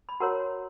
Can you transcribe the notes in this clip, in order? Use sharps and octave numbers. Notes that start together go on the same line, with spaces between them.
B5
F#4 A#4 C#5 F#5 A#5